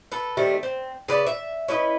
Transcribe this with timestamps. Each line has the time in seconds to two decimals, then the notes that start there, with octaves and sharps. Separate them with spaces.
0.12 A4 B4
0.37 D#3 G3 A3 C4
0.63 C4
1.08 C#3 B4 D5
1.26 E5
1.68 C#4 E4 B4 D#5